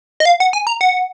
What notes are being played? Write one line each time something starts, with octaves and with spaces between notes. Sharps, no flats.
D#5
F5
F#5
G#5
A#5
F#5